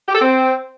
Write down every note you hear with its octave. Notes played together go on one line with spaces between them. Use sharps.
G4
A4
C4